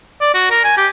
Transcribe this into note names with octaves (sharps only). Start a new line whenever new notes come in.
D5
F#4
A#4
G#5
G4